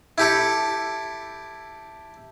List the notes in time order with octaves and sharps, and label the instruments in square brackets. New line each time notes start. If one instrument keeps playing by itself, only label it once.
[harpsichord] E4 G4 A4